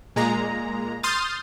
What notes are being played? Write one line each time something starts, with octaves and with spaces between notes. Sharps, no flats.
A#2 G#3 A#5
C6 D#6 F6 G6 A6